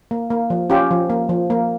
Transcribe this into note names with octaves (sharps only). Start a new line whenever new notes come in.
A#3
A#3
F3
C#4 F4 G4
F3
A#3
F3
A#3